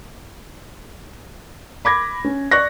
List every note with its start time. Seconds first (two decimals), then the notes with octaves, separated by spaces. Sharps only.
1.85 B5 D6 G#6 A#6
2.25 C#4
2.51 D5 C#6 F#6 A#6